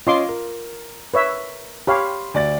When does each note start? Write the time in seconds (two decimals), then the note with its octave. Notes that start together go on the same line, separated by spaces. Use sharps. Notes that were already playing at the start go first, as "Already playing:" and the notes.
0.07 C#4 F4 D#5 C6 D6
0.29 A#4
1.14 B4 C#5 E5
1.87 G4 C#5 F5 B5 C6
2.34 D2 D5 A6